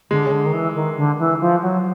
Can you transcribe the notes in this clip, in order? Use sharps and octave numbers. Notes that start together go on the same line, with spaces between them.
D3 G#3
C#3
D3
D#3
E3
D#3
D3
E3
F3
F#3